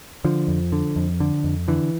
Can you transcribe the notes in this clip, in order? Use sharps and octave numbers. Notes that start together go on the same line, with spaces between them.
D3 F3
F2
D3
F2
D3
F2
D3 E3